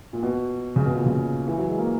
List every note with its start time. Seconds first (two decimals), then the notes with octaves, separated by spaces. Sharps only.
0.13 A#2
0.23 B2
0.76 C#3
0.85 B2
0.95 A#2
1.06 C#3
1.47 E3
1.58 F#3
1.68 G#3
1.78 A#3